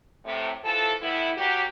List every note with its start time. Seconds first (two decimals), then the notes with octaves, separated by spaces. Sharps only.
0.25 A2 C3
0.64 E3 F3 A4
1.02 A2 G3 B3 E4
1.37 F#3 A#3 F#4 G4